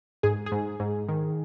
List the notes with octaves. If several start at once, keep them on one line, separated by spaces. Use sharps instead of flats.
G#2 G#4
G#4
G#2
G#2
D#3